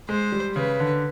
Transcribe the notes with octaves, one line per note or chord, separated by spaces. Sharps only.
G#3 C5
G3
C#3 B4
D3